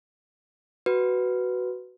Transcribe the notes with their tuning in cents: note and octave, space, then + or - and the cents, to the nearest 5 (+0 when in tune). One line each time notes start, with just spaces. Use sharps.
F#4 +10 B4 +0